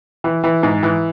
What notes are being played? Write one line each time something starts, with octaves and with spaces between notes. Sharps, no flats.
E3
E3
G#2
E3